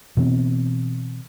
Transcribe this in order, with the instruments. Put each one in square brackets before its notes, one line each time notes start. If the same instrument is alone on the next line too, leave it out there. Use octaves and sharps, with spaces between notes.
[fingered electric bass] B2 E3 B3 C4